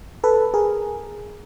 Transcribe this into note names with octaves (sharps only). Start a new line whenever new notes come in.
A4 B4
G#4 A#4